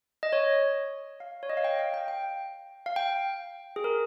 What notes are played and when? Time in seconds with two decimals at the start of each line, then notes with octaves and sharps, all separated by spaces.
0.23 D#5
0.33 C#5
1.20 F5
1.43 C#5
1.50 D#5
1.57 F5
1.64 G5
1.79 F5
1.94 G5
2.08 G5
2.86 F5
2.96 G5
3.76 G#4
3.84 A#4